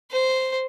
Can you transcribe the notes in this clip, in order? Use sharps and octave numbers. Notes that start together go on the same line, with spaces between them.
C5